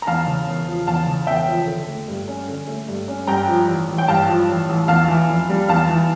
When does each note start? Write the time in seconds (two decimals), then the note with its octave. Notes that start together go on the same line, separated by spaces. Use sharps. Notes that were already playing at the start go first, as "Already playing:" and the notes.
0.02 A#5
0.07 E2 F5 A5
0.27 C#3
0.48 E1
0.68 F3
0.87 E2 F5 A5
1.07 C#3
1.27 E1 E5 G5
1.48 F3
1.67 D3
1.88 A3
2.08 G2
2.27 C#4
2.48 D3
2.68 A3
2.89 G2
3.08 C#4
3.27 G2 G5 A#5
3.48 F3
3.68 A1
3.88 A1
3.98 G5
4.08 G2 F5 A5
4.29 F3
4.49 A1
4.69 A1
4.88 E2 F5 A5
5.08 E3
5.28 F1
5.49 G3
5.68 E2 F5 A5
5.89 E3